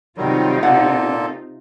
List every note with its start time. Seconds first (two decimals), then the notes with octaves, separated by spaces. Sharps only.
0.17 C3 D#3 F#3 G3 D#4 F4
0.63 A#2 A#3 A4 F#5